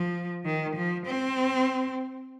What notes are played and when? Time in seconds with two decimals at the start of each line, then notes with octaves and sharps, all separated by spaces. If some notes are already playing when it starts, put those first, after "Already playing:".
Already playing: F3
0.45 D#3
0.76 F3
1.06 C4